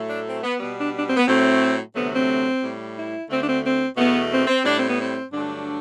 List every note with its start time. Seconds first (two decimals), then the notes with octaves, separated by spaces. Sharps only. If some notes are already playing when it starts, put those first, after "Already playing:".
Already playing: A2 F#3 A3
0.09 D4
0.26 C4
0.43 B3
0.59 B2 G3 B3
0.76 D4
0.94 D4
1.05 C4
1.16 B3
1.27 A2 F#3 A3 C4
1.94 D2 C3 F#3 A3 B3
2.11 C4
2.62 A2 G3
2.96 E4
3.29 D2 D3 A3 C4
3.38 D4
3.46 C4
3.63 C4
3.97 E2 B2 A3 B3
4.31 C4
4.47 C4
4.64 A2 G3 D4
4.76 C4
4.88 B3
4.99 C4
5.32 G2 D3 F#3 A3 D4